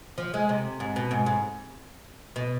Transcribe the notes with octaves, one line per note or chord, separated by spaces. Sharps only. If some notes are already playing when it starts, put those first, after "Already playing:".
F3
G#3
C3
G#2
B2
G#2
G#2
B2